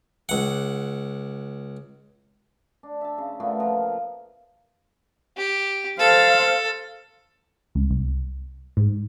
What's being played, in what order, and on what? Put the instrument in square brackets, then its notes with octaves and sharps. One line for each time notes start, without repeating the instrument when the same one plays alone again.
[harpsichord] C#2 F#5
[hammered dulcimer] D4
E5 A5
C#3
A#2 C#3 A3 B3
F3 A#4
[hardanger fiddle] G4
[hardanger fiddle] A4 [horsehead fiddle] C5 F5
[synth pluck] C#2
C2
G#2